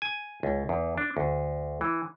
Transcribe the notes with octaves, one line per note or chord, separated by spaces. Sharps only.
G#5
C#2
E2
D4
D2
E3